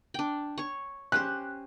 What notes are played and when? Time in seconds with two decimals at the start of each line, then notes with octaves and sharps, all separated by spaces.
0.14 D4 G5
0.58 C#5 C#6
1.12 C#4 G4 C5 F#6